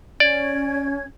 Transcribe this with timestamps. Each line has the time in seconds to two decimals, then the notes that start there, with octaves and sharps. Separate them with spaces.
0.20 C#4 D5 G#6